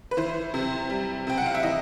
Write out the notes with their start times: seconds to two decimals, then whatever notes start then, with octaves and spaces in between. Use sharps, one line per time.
0.11 B4
0.17 E3 C5
0.54 C3
0.90 G3
1.27 C3 G5
1.37 F#5
1.46 F5
1.55 E5
1.63 E3 D#5